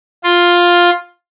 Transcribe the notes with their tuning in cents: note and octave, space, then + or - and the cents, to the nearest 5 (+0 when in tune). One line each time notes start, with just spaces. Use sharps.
F4 +5